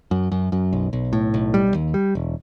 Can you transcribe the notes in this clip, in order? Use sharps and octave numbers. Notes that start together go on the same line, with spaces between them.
F#2
F#2
F#2
B1
B1
A2
B1
G3
D#2
G3
E1